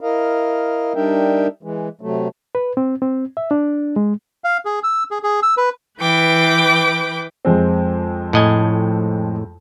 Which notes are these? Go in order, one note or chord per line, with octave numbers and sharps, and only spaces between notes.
E4 A#4 D#5 F5
G3 D4 D#4 A#4 E5 G5
E3 G#3
C3 F#3 A3
B4
C4
C4
E5
D4
G#3
F5
G#4
E6
G#4
G#4
E6
B4
E3 B4 G5 D6
F2 G#3 C4
A2 D#5 G#5